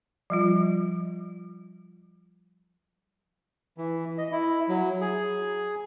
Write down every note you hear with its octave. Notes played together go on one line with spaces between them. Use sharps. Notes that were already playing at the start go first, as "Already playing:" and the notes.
F3 G3 F4
E3
D#5
E4
F#3
G#4